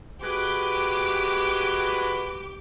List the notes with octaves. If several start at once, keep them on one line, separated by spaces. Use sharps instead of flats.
G#3 F#4 G4 B4 D6